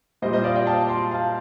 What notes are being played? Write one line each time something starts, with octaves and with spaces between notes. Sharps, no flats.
A#2 G3 C5 D#5
C5 D#5
D5 F5
D#5 G5
F5 A5
A5 C6
F5 A5